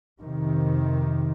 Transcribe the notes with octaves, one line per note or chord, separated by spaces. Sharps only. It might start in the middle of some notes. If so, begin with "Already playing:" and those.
F2 C3 D#3